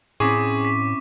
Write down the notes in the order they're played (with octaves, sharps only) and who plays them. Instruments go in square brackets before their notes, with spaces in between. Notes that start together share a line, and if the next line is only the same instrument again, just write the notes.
[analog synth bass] A2 [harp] C4 C#4 E4 [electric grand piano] G#4 [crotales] C#6 D6 B6
[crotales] B6